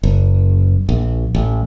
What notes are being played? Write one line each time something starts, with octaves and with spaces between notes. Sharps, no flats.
F#1
A#1
A1